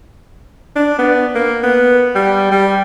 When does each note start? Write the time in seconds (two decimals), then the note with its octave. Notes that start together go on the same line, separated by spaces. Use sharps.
0.76 D4
0.98 B3
1.35 A#3
1.63 B3
2.15 G3
2.51 G3